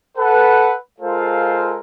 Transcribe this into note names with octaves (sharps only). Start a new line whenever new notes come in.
A4 B4 F#5
G#3 F4 A4 A#4 C5 F5